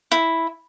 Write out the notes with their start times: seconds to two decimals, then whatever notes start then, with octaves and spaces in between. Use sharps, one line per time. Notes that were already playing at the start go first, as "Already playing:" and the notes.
0.12 E4